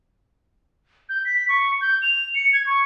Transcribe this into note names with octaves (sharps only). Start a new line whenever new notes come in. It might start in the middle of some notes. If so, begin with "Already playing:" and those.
G6
B6
C#6
G6
F7
C#7
G#6
C#6